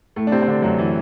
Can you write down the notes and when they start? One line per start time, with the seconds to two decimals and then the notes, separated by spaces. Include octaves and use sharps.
0.16 A2 A3
0.27 D4
0.32 C3 C4
0.42 C4
0.48 D3 D4
0.62 F#2 F#3
0.78 E3